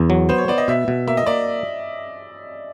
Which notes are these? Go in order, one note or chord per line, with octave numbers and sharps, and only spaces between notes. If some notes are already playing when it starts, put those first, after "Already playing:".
Already playing: E2
F#3
B3 C5
C#5
B3 D5
D#5
B2 E5
B2
A#3 E5
D#5
A#3 D5